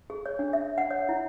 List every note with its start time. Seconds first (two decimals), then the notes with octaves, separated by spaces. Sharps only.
0.10 G#4
0.26 C#5
0.39 D4
0.53 E5
0.78 F#5
0.91 C#5
1.09 E4